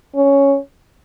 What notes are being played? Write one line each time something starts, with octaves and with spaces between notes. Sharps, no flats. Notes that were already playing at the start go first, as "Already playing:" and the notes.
C#4